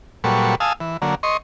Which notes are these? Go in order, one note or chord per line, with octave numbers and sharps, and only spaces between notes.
A#2 F#3 G3 A4 B4 C#6
F5 G#5 A5 D#6 E6
E3
D3 F#3 A#3
D#5 C6 C#6